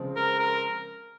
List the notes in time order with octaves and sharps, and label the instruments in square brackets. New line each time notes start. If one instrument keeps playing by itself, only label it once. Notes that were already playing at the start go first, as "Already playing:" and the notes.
Already playing: [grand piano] C#3 F3 G#3 C4
[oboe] A#4
A#4